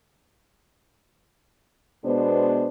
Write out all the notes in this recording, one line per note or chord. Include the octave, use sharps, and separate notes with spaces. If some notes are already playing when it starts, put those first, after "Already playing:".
B2 G#3 B3 D4 C5